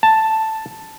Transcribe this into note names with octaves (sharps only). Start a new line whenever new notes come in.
A5